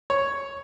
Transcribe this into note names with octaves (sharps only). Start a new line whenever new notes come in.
C#5